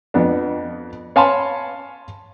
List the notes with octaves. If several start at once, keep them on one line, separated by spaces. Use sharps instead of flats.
F2 B3 D4
C#5 F5 G#5 A5 B5 C6